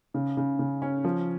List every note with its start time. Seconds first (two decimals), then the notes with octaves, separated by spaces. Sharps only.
0.14 C#3
0.37 C#3
0.59 C#3
0.82 C#4
1.04 F3